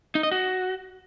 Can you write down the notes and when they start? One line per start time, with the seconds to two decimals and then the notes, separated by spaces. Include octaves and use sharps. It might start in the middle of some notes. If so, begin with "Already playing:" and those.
0.15 D#4
0.23 D#5
0.31 F#4